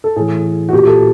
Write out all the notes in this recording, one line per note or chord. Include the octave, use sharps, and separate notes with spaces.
A4
A2 E3 G#4
F#4
A#2 G4
A4